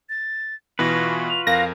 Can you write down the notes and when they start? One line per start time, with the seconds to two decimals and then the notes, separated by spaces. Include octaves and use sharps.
0.09 A6
0.79 B2 E3 F4 F#4 B4 A#6
1.30 F7
1.47 F2 A#4 F5 A#6